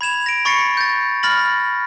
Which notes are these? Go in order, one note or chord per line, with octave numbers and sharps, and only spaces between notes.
B5 G#6 E7 F7
A#6 D7
B5 C#6 A6 A#6 C7 C#7
G6 A6
B5 F6 A6 A#6 F#7